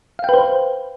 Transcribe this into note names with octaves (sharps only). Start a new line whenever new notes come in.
B4 C5 F5 G5